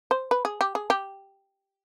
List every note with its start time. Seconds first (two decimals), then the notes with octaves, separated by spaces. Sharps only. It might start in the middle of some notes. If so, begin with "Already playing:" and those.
0.11 C5
0.31 B4
0.45 G#4
0.61 G4
0.75 G#4
0.90 G4